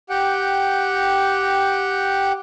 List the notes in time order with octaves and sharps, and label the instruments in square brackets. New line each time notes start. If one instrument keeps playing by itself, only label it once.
[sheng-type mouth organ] G4 F#5 G5